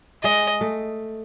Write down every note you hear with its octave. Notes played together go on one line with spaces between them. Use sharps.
G#3 D#5
A3